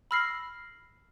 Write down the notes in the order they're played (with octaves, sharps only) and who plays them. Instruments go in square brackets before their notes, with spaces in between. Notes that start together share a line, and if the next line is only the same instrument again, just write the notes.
[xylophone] B5 E6 F6 A#6 C7